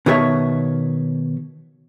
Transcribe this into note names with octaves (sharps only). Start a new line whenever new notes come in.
B2 D#3 G#4 C#5 E5 A5